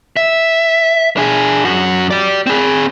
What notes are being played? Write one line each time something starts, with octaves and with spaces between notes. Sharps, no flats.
E5
D4 G#4
F#2 F#4
G4 D5
C4 G#4